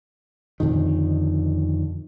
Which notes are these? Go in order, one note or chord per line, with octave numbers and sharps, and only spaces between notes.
F2 A#2 D3 D#3